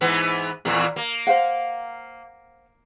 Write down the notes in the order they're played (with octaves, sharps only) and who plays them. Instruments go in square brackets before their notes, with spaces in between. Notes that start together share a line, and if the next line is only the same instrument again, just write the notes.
[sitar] G#2 E3 B3
[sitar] E2 A#2 E3 [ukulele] A#4
[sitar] A#3
[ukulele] C5 F5 F#5